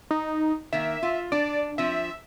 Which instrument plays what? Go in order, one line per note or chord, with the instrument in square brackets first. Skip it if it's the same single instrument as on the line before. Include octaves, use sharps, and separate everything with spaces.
[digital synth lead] D#4
[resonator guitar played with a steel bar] D#3 A#3 [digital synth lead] E5
[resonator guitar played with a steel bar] F4
[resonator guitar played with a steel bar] D4 [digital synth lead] D5
[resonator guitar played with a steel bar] F3 C4 [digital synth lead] E5